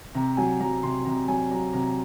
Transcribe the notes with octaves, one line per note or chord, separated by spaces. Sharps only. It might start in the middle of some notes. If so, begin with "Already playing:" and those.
C3 A#5
F#3 G#5
F#3 A#5
C3 C6
C3 A#5
F#3 G#5
F#3 A#5
C3 A#5